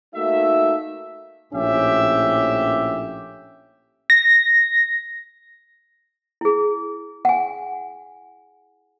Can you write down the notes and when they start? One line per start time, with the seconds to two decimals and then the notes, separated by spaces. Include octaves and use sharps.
0.15 A3 A#3 D#4 F#4 E5
1.53 A#1 A2 C#4 G4 E5
4.10 A#6
6.41 E4 G#4
7.25 F#5 G#5